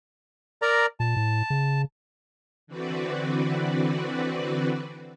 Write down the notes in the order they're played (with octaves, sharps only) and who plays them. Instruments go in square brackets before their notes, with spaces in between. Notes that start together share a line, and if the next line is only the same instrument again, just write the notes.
[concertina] A#4 D5 A#5
[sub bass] A#2 [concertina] A5
[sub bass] A2
C#3
[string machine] D3 E3 C4 F#4 B4 D5